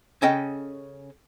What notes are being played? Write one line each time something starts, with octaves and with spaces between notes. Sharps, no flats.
C#3 C#4 A4 D#5 G5